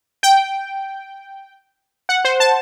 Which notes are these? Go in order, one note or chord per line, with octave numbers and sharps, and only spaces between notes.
G5
F#5
C5
A5